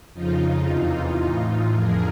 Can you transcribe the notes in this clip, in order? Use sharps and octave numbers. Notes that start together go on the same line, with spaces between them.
F2 C#3 F3 D#4 F4
E2 C3 E3
A2 E3
F2 D3 F3 G#4 A#4